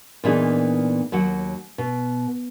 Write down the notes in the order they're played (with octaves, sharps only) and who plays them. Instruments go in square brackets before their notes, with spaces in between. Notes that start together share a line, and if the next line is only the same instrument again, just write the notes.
[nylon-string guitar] A#2 E3 B3 D4 D#4 G#4
D#2 F#3 F#4 F#5
B2